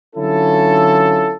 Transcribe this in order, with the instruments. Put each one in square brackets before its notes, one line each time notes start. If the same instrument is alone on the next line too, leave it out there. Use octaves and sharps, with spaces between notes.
[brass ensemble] D3 F#3 C#4 E4 F4 A4